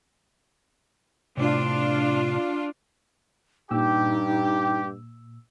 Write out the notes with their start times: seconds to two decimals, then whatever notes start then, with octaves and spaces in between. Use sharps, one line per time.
1.37 A2 C3 D4 F4
3.71 G2 A#2 D#4 G4 E6